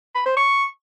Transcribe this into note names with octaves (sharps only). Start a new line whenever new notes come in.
B5
C5
C#6